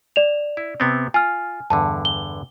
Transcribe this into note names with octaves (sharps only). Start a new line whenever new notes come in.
D5 E7 F7
E4
C3 B3 C4
F4 G#5 F6
E2 G2 D3 A5
G7